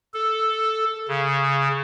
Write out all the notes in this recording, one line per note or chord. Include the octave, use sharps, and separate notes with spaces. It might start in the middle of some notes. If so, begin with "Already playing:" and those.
A4
C#3